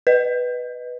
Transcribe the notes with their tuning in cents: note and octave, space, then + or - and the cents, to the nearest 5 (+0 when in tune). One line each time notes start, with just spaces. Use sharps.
B4 +0 D#5 +0